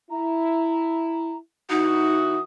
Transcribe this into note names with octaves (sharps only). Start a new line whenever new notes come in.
E4 A#5
E3 D#4 E4 F#4 D#6